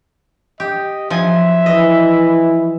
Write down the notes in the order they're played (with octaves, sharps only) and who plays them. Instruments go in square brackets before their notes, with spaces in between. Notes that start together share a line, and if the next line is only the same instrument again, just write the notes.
[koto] G4 [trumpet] D#5
[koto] F3 F#3 G#5 [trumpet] E5
[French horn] E3 [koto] D#5